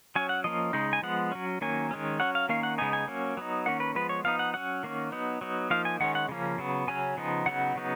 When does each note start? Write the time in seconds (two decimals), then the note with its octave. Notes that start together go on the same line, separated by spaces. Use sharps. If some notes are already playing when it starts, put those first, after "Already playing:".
0.16 F#3 C#4 G#5
0.29 F#5
0.44 F3 A#3 C#4 D#5
0.73 C#3 G#3 D#4
0.93 G#5
1.02 F3 G#3 B3 F#5
1.32 F#3 C#4
1.61 D#3 F#3 A#3 C#4 G#5
1.91 D#3 G#3 C#4
2.20 F#3 C#4 F#5
2.35 F5
2.49 D#3 A#3 C#4 F5
2.63 F#5
2.78 C#3 G#3 B3 D#4 G#5
2.93 G#5
3.08 F#3 A#3 C#4
3.37 F#3 B3 D#4
3.66 D#3 A#3 C#4 F#5
3.80 B4
3.95 F3 G#3 B3 B4
4.09 C#5
4.24 F3 B3 D#4 F5
4.39 F#5
4.54 F#3 C#4 F#5
4.83 D#3 A#3 C#4
5.12 F#3 B3 D#4
5.41 F#3 B3 D#4
5.70 F3 A#3 D#4 F5
5.85 G#5
6.00 D#3 G#3 C#4 F#5
6.15 F#5
6.29 C#3 F3 A#3 C#4
6.58 C#3 F#3 B3
6.87 C#3 F#3 C#4 G#5
7.17 C#3 F3 B3 D#4
7.46 C#3 F#3 B3 D#4 F#5
7.75 C#3 F#3 B3 D#4